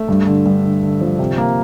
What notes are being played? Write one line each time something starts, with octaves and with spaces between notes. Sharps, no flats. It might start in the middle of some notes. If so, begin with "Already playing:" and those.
Already playing: A3 E5
G2
D3
G2
D3
D3
F3
C3
A#3